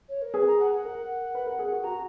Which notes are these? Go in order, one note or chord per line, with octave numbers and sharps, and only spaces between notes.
C#5
A#4
G#4 B4
A#5
F#5
F#5
A#4
B4
A#4
G#4
F#4
F#4 A#5